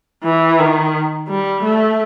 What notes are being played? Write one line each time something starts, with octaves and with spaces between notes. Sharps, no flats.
E3
D#3
G3
A3